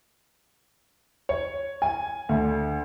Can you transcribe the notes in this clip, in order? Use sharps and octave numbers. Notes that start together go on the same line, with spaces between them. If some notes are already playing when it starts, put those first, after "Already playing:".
C#5
G#5
D2